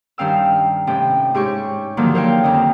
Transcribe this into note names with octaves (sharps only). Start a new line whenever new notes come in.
G2 D#3 C#4 F5 G5 E6
A2 C3 C#4 G5
G#2 G4 C#5 C#6
D3 D#3 F3 F#3 A#3
A#4 C5 C#5 F5 G5
F2 D3 C#4 D#5